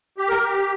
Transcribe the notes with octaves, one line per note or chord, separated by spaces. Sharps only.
G4
A#4
G4